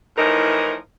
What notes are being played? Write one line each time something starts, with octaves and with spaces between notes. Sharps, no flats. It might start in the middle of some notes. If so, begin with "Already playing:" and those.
A2 E3 F3 D#4 A#4